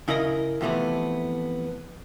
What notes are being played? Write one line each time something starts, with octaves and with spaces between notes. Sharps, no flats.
C#3 E4 A#4 D#5 A#5
F2 C3 E3 A3 B3